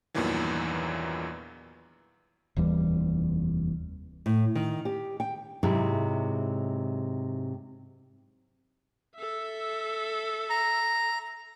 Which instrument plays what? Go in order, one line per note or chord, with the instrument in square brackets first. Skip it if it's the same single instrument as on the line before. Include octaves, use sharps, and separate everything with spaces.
[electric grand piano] E2 G2 A#2 D#3 E3 F#3
[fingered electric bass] F1 D#2 E3 G3
[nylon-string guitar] A2
D#3
G4
G5
G#2 C3 F#3 G#3 E4
[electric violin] A4 E5
[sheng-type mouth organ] A#5